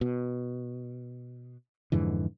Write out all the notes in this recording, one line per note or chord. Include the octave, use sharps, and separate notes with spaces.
B2
F2 G#2 D3 E3